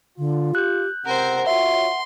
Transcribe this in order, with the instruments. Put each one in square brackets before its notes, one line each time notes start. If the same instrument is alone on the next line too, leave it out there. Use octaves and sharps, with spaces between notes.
[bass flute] D3 [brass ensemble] F4
[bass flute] G4 [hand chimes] F#6 G6
[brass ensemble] C#2 C3 C4 [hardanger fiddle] A#4 C5 [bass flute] F#5
[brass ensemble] F4 F#4 C#5 [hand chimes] E5 [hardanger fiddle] C6